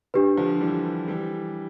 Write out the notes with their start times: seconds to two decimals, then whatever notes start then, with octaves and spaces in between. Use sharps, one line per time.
0.14 D4 G4 B4
0.37 D3 F3
0.61 E3 G3
1.08 E3 G3